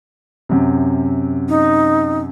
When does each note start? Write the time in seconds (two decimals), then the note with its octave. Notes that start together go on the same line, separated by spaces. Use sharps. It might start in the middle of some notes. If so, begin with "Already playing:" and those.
0.49 F#2 C3
1.48 D#4